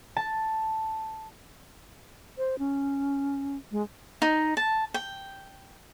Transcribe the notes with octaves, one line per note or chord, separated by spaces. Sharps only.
A5
C5
C#4
G#3
D#4
A5
G5